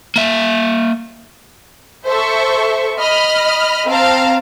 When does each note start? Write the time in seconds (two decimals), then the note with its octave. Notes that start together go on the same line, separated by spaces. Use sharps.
0.16 A#3 E5
2.06 A4 C5 E5 C#6
2.99 D#5 B5 F6
3.87 C4 F5 A5 A#5